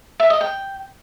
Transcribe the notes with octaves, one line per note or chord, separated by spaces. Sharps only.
E5
D#5
G5